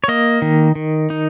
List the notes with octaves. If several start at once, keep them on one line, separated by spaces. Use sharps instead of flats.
C#5
A#3 D#5
D#3
D#3
D#4